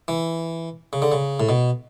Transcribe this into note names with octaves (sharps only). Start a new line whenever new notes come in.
E3
C#3
D3
C#3
A2
B2